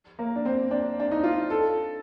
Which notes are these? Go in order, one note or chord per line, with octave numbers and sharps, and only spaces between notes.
A#3
D4
C4
D4
D4
D#4
F4
A4